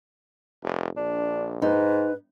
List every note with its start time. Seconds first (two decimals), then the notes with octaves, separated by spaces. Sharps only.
0.63 F1
0.97 A#1 D4
1.62 G#2 D#4 B4